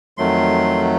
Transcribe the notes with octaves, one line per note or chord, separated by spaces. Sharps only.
F2 D#3 F#3 A3 C6